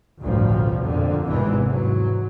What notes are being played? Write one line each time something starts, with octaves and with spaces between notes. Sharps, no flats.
A1 D2 G2 B2 F3
F2 A#2 D3
G#1 E2 G#2 C3 E3 G#3
G#2 F#3